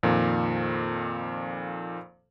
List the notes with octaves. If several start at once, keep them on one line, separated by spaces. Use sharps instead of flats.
F2 A#2 D#3